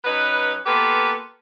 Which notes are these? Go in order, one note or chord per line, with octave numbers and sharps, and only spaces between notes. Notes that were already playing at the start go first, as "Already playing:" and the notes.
F#3 C#4 D#4 B4
A#3 B3 F4 G4 A4 B4